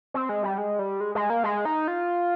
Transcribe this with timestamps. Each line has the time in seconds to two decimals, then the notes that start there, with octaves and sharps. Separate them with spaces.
0.14 C4
0.29 G#3
0.43 G3
0.58 G#3
0.79 G3
1.01 G#3
1.15 G#3
1.30 A#3
1.44 G#3
1.65 D#4
1.88 F4